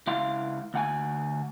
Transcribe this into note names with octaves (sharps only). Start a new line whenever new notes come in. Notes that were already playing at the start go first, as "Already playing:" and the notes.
C#2 E4 F5 F#5 C6
D2 F#5 G#5